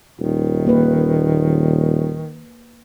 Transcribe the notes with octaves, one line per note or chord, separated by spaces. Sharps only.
D#1 D#3
A#3 B4